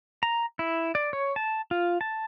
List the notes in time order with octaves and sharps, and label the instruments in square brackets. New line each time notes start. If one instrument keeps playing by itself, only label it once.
[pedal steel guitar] A#5
E4
D5
C#5
A5
F4
A5